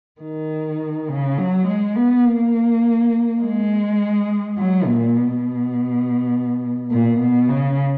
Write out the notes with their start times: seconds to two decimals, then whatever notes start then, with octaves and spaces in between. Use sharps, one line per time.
0.21 D#3
1.09 C#3
1.37 F#3
1.67 G#3
1.96 B3
2.25 A#3
3.41 G#3
4.58 F#3
4.87 A#2
5.17 B2
6.91 A#2
7.20 B2
7.49 C#3